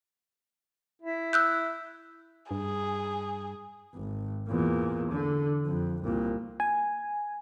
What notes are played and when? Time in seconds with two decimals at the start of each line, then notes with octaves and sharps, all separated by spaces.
1.02 E4
1.33 E6 F#6 G6
2.51 G2 G#4
3.94 G#1
4.49 E2 A#2
5.11 D3
5.67 F2
6.04 C2 A#2
6.60 G#5